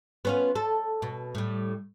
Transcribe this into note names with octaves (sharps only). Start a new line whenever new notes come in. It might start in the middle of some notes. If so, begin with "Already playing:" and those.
B3 C#4 F4
A4
B2
A2 G3